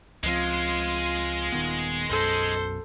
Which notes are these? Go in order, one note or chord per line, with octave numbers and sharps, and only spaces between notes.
C#2 F3 G#3 C4 F4
D#1 D#3 B3
B1 F#2 A4 C5